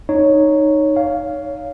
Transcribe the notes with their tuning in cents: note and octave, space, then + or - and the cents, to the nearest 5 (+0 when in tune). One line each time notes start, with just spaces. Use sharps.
D#4 -10 C#5 +0
C#5 +25 F5 +0